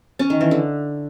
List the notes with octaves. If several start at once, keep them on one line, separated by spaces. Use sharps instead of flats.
C#4
D#3
E3
D3